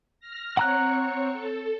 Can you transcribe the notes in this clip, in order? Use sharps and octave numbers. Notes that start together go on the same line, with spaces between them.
F6 A#6
C4 C#5 F#5 A#5 F#6 C#7
A4